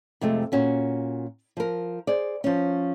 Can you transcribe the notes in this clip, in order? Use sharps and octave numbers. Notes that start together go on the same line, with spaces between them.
F2 C3 G#3 A3
A#2 C#4 F#4
F3 A#4
G#4 C5 D5
F3 C#4